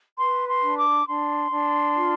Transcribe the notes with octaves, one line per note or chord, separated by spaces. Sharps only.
B4 C6
C6
D4
D6
D4 C6
D4
F4